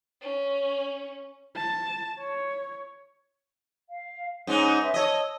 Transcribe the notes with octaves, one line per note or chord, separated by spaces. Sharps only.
C#4
A5
C#5
F5
G#2 C#4 D#4 G#5
B4 C#5 E5
C#5 D#5 A5 E6